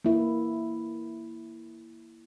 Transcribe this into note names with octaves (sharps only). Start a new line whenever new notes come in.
A#3 E4